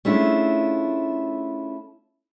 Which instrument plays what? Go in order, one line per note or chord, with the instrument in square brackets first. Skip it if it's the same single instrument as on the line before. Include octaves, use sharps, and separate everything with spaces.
[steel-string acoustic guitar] A3 C#4 D4 E4 F4 G#4